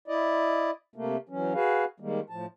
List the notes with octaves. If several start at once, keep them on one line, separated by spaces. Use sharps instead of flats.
E4 D5 D#5
C3 A3 A#3
E3 F#3 C#4
F#4 G#4 B4 F5
D#3 G3 G#3 A#3
A2 F3 A5